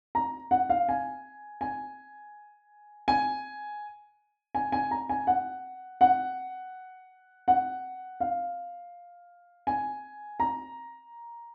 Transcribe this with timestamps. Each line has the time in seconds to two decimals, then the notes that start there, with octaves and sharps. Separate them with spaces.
0.15 A#5
0.51 F#5
0.70 F5
0.89 G#5
1.61 G#5
3.08 G#5
4.55 G#5
4.72 G#5
4.91 A#5
5.09 G#5
5.27 F#5
6.01 F#5
7.48 F#5
8.20 F5
9.67 G#5
10.40 A#5